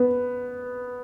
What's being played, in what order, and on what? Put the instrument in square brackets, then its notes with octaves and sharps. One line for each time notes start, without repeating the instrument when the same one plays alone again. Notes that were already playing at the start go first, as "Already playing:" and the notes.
Already playing: [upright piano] B3